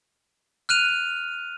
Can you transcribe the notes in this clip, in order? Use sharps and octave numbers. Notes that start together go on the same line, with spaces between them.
F6 F#6 D#7 F7